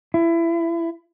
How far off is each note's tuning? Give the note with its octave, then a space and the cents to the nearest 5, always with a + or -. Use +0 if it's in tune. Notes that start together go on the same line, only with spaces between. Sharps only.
E4 +25